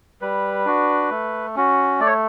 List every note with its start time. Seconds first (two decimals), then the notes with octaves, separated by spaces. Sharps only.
0.21 G3 B4
0.65 D4 F#4
1.11 A3
1.56 C#4 F#4
2.00 A3 D5
2.07 C#5